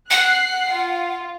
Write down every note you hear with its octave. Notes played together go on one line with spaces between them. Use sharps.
F#5 F#6 C7
F4